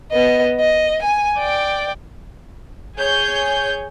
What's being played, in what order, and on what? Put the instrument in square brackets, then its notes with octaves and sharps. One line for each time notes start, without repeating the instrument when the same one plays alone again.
[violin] B3 D#5
D#5
G#5
D5 G5
[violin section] G#4 C#5 G6